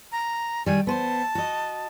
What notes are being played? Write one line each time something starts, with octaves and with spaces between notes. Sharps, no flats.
A#5
D#3 G3 G#5
B3 B4 C5 A5
F#4 D#5